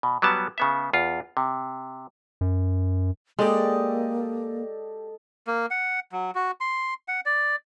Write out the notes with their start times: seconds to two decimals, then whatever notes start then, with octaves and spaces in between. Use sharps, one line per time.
0.03 B2
0.22 F#3 G3 B3 A5
0.58 C#3 B3 E5
0.93 E2 F4
1.37 C3
2.41 F#2
3.39 G#3 A#3 G4 A4 D5 D#5
5.47 A#3
5.71 F#5
6.12 F#3
6.35 F#4
6.61 C6
7.08 F#5
7.26 D5